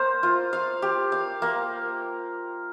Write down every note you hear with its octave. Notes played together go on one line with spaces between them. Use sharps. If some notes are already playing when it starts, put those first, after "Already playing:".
Already playing: A#3 C5 F5
F4
F5
G4
F5
A#3